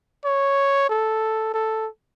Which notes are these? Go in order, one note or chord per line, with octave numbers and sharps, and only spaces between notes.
C#5
A4
A4